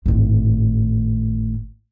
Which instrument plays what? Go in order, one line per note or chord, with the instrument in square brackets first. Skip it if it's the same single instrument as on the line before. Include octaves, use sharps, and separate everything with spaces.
[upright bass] G#1 A2